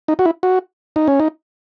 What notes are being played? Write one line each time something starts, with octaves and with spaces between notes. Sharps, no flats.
D#4
F#4
E4
F#4
D#4
C#4
D#4